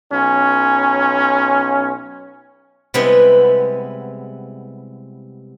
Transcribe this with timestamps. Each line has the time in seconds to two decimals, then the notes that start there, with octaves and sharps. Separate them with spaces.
0.11 B1 C#4
2.94 C3 G3 G#3 B3 E4